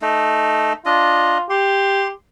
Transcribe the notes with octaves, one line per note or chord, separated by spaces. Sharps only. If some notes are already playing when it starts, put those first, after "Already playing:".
A3 D#4
D4 F4 D#5
G4 C6